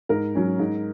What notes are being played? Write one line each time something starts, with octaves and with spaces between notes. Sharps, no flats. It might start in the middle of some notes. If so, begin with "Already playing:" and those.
G#2 A#4
F#3 C#4
G#2